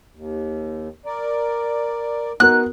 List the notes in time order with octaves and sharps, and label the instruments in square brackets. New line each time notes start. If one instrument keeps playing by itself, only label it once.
[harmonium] D#2
A#4 D5
[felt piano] B3 F#4 A#4 [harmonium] D#4 [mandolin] F#6